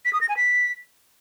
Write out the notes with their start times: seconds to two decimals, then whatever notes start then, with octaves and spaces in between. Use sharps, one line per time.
0.05 B6
0.13 D#6
0.21 A#6
0.29 G#5
0.37 B6